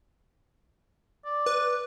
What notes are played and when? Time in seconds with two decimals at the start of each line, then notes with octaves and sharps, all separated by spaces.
1.25 D5
1.46 B4